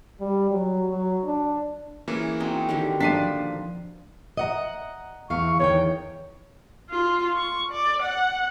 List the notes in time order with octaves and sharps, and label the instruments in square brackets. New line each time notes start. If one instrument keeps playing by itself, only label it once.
[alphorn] G3
F#3
F#3
D4
[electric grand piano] E3 A#3 C#4 [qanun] G#4
[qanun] C4 [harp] D#4 F#4
[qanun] D3 D#3 G4 [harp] E4
[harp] A#2 F3 [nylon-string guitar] D4 [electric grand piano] B6 C7 D#7
[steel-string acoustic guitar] D#5 F#5 A#5
[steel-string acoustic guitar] E2 F5 [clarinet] C#6
[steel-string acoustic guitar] E2 D#3 G5 [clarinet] C#5
[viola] F4
C#6
D5
F#5